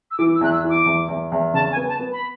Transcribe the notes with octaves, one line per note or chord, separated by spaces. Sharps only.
E6
E3 D6
E6
E2 F#6
E6
E3
D6
E2
E2
E2
C#3 A5
G#5
B3
A5
B3
B5